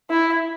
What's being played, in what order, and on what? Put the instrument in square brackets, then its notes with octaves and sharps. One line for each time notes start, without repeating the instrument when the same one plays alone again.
[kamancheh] E4